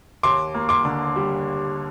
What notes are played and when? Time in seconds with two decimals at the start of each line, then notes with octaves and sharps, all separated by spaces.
0.23 D#2 C6 D6
0.54 A#3
0.69 C6 D6
0.85 D3
1.16 G3